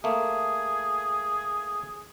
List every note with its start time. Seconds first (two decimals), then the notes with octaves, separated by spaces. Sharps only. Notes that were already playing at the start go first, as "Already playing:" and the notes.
0.04 A3 A#3 G#4